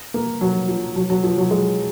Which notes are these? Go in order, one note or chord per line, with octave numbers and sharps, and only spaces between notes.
A#3
F#3
F3
F#3
F#3
F3
F#3
G#3